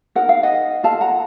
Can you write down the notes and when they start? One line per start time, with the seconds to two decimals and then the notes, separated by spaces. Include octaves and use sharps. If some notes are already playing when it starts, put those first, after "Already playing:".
0.16 D#4 F#4 A#4 F#5
0.29 F5
0.43 D#5 F#5
0.83 F4 A4 F5 A5
1.01 F#5 A#5